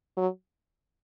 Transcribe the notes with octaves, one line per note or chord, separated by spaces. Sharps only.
F#3